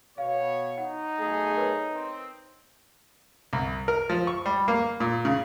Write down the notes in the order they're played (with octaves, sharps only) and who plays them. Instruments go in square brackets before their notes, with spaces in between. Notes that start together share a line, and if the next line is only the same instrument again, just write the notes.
[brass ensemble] B2 C#5 [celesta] F5
[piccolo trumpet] D#4 [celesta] F#5
[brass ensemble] B1 A3 G#4
[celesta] A#4 B4 C#5
[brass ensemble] C4
[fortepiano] C2
A#4
F3
C#6
G3
A#3
A#2
C#3